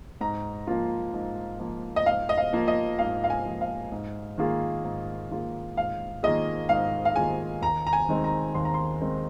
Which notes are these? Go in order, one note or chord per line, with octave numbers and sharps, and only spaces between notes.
G#2 A#5
F3 A#3 F4
G#2
F3 A#3 F4
D#5
G#2 F5
D#5
F5
F3 A#3 F4
D#5
G#2 F5
F5
G#5
F3 A#3 F4
F5
G#2
D#3 A#3 F4 G#4
G#2
D#3 A#3 F4 G#4
G#2 F5
D#3 A#3 F4 G#4 D#5
G#2 F5
F5
D#3 A#3 F4 G#4 G#5
D#2 A#5
A#5
G#5
D#3 G#3 C4 D#4
A#5
D#2 C6
A#5
C6
D#3 G#3 C4 D#4